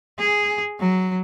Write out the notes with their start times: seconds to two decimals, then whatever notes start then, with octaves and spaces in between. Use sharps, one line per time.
0.19 G#4
0.80 F#3